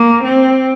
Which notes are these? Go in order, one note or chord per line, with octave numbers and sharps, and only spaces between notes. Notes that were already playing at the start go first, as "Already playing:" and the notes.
Already playing: A#3
C4